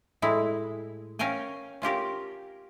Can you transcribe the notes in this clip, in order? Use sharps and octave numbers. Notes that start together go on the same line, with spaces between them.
A2 G#3 E4
C#4 A#4 F5 G5 G#5
C#4 F4 G4 A#4